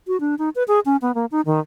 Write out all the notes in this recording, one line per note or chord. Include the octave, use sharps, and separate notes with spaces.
F#4
D4
D#4
B4
G#4
C#4
B3
A#3
D#4
D#3